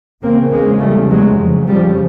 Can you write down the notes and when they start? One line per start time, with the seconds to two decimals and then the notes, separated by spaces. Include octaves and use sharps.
0.22 E2 C#3 A#3 C4
0.51 G#3 A#3
0.80 G3 A3
1.09 F#3 G#3
1.38 F2 C#3
1.67 F3 G3